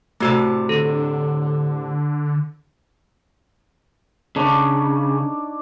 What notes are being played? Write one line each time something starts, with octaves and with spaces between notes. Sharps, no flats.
A2 C3 A3 F#4 A5
D3 A4
C#3 D4 D#4 C#5